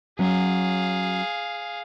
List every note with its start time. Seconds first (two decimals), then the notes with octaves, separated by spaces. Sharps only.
0.19 F#3 C#4 G#4 F5